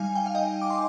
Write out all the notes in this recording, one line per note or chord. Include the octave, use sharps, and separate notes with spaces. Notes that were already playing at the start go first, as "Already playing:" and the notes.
Already playing: G3 D#4 F5 G#5
G5
F5
D#5 G5
D6
C6